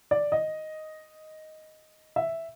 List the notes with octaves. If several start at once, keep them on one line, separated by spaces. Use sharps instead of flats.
D5
D#5
E5